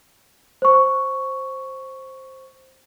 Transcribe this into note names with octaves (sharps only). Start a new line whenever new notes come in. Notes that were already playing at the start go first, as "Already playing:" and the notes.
C5 C#6